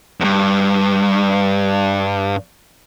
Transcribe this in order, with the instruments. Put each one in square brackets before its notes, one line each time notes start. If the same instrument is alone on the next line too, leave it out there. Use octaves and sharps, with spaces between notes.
[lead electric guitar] E2 G2